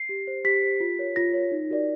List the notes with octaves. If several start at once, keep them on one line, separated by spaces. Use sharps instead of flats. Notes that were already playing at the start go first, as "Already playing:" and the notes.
Already playing: C7
G4
C5
G4 B6
C5
F4
A#4 C#5
F4 A#6
A#4 C#5
D#4
F#4 A#4 D5